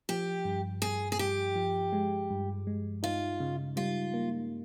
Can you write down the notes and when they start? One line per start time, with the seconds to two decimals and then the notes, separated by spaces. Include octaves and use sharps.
0.09 F3 G4
0.45 G2
0.82 G2 G#4
1.12 G#4
1.19 G2 G4
1.56 F3
1.93 G#3
2.30 G2
2.67 G#3
3.03 D#4 F4
3.40 C#3
3.76 G3 F4
4.14 A#3